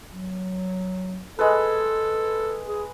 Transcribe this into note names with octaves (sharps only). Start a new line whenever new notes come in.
F#3
G#3 A4 B4
G#4